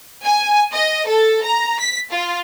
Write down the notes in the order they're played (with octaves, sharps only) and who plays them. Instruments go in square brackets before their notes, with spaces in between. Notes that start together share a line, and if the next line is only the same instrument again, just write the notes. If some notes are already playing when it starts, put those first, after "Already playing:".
[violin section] G#5
D#5
A4
A#5
B6
F4